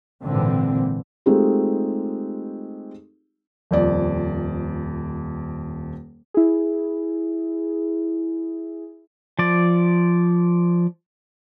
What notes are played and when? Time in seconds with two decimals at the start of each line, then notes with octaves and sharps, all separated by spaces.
0.24 G#1 A#2 D3 E3 C4
1.26 G#3 A3 C4 D#4 F4 G4
3.71 D#1 F2 D5
6.34 E4 G#4
9.39 F3 D5